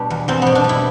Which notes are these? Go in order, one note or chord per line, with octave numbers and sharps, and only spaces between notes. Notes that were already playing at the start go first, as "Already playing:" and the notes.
Already playing: B2 G3 D4
E2
E2 C4
B2 B3
D4
G3
E4